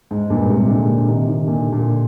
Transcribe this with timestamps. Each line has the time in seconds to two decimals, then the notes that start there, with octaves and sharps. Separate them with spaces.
0.11 G#2
0.30 G2 A#2
0.50 G#2 C3
0.70 A#2 D3
0.88 A#2 D3
1.08 C3 D#3
1.28 C3 D#3
1.47 A#2 D3
1.72 A#2 D3